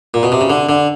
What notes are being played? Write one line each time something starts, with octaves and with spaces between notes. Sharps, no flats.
A#2
B2
C3
C#3
D3
D3